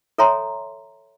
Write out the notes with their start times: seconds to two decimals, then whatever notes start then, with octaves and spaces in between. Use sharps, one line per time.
0.18 A4 C#5 E5 G#5 A#5 C6